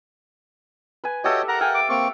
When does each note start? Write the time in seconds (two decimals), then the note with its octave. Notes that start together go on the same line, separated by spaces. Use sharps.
1.04 B4 G#5
1.24 F#4 G4 A4 C#5 D#5 E5 G5
1.48 A#4 F#5 A#5
1.61 F5 G5 G#5
1.74 D6
1.89 A#3 C4 C#6 D6